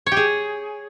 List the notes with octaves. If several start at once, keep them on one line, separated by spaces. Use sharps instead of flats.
C#5
G4
G#4